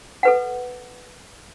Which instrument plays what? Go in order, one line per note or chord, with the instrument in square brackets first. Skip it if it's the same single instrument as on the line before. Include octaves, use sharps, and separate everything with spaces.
[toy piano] A4 B4 F#5